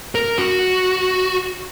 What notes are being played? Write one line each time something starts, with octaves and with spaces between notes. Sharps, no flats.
A#4
F#4